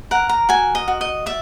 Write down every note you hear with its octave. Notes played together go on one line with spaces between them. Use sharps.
A#4 F#5
A#5
F#4 G#5
D#5
F#4
D#5
D5 E5